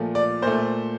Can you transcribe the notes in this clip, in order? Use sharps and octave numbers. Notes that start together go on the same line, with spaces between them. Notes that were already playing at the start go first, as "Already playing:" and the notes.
Already playing: A#2 F3 A3
D5
A#2 A3 C5